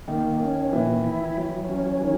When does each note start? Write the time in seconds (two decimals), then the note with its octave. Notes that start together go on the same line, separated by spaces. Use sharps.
0.08 D#3 A#3
0.41 C#4
0.73 A#2 E3
1.04 E4
1.37 F#3
1.69 C#4
2.02 D#3